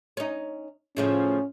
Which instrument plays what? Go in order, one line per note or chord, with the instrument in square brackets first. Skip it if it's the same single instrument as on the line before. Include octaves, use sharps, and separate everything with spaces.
[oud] C#4 D#4
[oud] A2 C#3 F3 [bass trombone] C#4